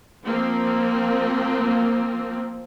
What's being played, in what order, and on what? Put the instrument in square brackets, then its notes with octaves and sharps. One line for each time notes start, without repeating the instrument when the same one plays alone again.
[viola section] F3 A#3 C4